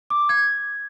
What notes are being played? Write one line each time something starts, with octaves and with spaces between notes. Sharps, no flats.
D6
G#6